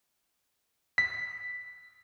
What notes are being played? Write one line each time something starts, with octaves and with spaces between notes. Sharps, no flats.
B6